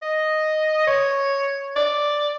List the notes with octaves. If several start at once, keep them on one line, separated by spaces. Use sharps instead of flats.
D#5
C#5
D5